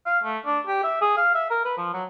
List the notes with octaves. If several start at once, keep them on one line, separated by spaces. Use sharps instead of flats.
F5
A3
D4
G4
E5
G#4
F5
E5
A#4
B4
F3
F#3